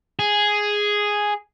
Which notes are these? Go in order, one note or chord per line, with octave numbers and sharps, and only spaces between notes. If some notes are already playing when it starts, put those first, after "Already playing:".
G#4